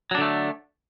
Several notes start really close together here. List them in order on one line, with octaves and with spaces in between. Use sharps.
F#3 D4 D3 A3